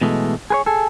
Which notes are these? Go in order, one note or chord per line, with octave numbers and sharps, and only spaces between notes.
B2 E3 G#3 A3
G#4 B4 C#5
G#4 A4